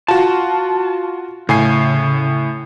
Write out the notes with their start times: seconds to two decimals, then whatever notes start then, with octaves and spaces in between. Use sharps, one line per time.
0.08 F4 F#4 A5
1.49 A2 C#3 G#5 C7